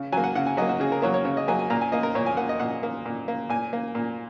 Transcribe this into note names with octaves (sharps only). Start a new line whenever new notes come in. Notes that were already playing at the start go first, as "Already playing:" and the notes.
Already playing: C#3
F#3 A#3 G#5
F#5
C#3 F#5
G#5
F#3 A#3 D#5
F#4
C#3 G#4
A#4
F#3 A#3 C#5
C#5
C#3 C#5
D#5
F#3 A#3 G#5
G#5
A#2 A#5
G#5
A#3 D#5
A#4
A#2 C#5
G#5
A#3 F#5
D#5
A#2 F#5
A#3
A#2
A#3
A#2 G#5
A#3
A#2